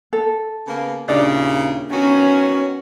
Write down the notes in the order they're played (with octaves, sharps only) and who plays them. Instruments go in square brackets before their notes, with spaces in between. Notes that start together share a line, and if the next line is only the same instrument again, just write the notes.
[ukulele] A4
[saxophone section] C#3 A#3 B3
[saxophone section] D#2 A#2 C#3 [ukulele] D4 E4 D5
[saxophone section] D#3 B3 F#4 [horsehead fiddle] C#4